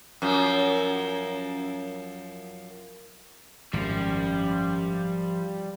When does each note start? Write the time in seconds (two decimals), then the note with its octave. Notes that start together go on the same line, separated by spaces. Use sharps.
0.22 F#2 F3
3.73 G#1 F#2 F3 G3